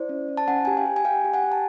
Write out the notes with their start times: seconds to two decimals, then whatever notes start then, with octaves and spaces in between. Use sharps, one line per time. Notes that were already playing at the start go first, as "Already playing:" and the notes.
Already playing: E4 C5 D5
0.09 C#4
0.28 C#4
0.37 A5
0.48 C#4 F#5 G#5
0.65 G4 G#5
0.77 F5 G5
0.85 G4
0.96 G#5
1.05 G4 F5 G5
1.24 G4
1.34 F#5 G#5
1.44 G4
1.52 A5